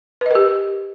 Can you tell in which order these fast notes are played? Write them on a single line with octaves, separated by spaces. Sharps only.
B4 D#5 A#4 G4